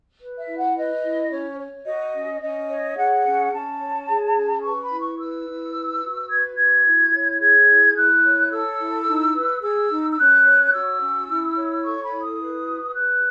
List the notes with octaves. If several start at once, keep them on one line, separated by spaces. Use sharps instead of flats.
B4
E5
E4
F#5
B4 D#5
E4
C#4 C#5
C#5
F#4 D#5
C#4
C#4 D#5
C#5
G#4 F#5
C#4
C#4 A5
C#5
G#4
C#4
B4 C#6
B5
E4
C#6
B4 E6
E4
B4
F#4
B4 G#6
F#4 G#6
E4
C#5
G#4 G#6
E4
E4 F#6
C#5
A4 E6
E4
D#4
B4
G#4 E6
D#4
E6
C#4 F#6
C#5
F#4 E6
C#4
E4
C#5
A4 C#6
B5
E4
D#6
B4
F#4
B4 F#6